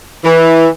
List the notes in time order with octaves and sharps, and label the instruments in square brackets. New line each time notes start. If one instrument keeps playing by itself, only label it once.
[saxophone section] E3